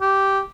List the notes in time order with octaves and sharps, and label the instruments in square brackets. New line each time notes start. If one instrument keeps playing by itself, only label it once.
[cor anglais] G4